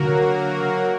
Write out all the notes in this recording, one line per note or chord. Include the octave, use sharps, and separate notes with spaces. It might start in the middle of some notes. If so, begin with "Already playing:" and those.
Already playing: D3 F#3 A#3 F#4 A#4